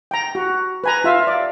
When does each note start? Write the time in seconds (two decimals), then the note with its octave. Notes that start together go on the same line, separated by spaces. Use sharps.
0.11 G5 A#5
0.35 F#4
0.84 B4 G#5 A#5
1.04 F4 E5 F5
1.27 D5